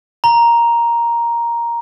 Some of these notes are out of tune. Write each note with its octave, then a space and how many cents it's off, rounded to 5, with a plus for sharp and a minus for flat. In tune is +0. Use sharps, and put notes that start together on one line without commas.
A#5 +5